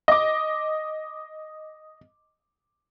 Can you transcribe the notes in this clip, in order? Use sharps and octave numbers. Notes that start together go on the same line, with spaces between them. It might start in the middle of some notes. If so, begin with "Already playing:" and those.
D#5 D6